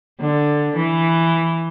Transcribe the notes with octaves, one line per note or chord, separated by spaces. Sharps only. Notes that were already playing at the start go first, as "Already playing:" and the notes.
D3
E3